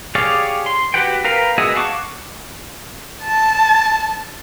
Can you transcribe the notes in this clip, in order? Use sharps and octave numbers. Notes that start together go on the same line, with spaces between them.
G4 G#4 C#5 D5 F5
C6
F#4 G4 B4 F#5 G5
A#4 B4 F5 G5
B3 F#4 G#4 D#5 E5
F5 F#5 A5 C#6 D6
A5